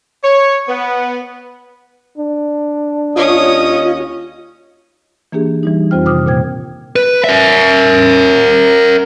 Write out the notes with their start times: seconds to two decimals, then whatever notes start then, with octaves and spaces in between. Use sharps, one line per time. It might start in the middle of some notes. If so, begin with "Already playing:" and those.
0.23 C#5
0.68 B3
2.18 D4
3.16 D#2 C#4 F4 C#5 D#5 D#6
5.32 E3 A#3 D4 G4 G#4
5.63 E3 G3 D#4
5.91 F2 C4 F4 C5 G5 F6
6.05 C3 D#3 C5 D6 D#6 F6
6.26 A#2 A#3 C5 G5 G#6
6.96 B4
7.24 A#4 E5